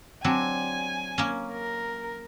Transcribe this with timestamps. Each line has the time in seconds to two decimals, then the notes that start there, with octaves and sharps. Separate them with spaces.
0.24 F#3 C4 D4 G#5
1.18 A#3 C#4
1.52 A#4